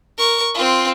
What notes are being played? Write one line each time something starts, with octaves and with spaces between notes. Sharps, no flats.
A#4 C#6
C4 F4